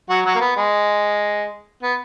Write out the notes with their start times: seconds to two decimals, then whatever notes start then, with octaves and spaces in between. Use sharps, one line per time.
0.09 F#3 F#4
0.26 F#3 F#4
0.35 A#3
0.41 B3
0.57 G#3
1.83 B3